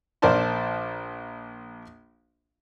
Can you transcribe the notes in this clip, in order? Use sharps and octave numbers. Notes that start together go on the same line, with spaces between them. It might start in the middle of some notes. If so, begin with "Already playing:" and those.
A#1 A#4 C5 D5 A5 C6